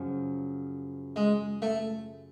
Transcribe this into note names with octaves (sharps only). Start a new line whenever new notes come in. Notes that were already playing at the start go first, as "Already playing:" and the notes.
Already playing: F#2 C#3 F3
G#3
A3